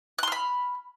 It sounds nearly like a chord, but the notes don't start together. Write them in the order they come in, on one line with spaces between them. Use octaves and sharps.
F#6 C6 F6 B5